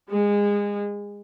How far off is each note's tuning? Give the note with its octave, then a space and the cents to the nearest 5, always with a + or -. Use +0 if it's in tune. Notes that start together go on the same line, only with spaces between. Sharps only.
G#3 -25